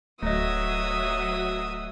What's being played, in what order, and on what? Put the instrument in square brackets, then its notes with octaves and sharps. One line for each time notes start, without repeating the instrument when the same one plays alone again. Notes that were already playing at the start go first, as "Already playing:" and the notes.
[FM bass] D1 [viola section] F#3 [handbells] A3 D#5 [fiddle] E5 D#6